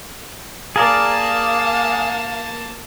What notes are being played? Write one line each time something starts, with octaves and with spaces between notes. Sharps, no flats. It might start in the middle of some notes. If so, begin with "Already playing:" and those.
A#3 G#4 A#4 D5 F5 A5